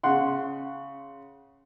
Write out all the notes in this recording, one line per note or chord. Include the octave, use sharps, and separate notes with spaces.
C#3 F#5 C6